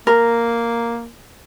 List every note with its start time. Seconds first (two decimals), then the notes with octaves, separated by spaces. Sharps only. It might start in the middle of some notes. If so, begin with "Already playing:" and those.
0.07 A#3 A#4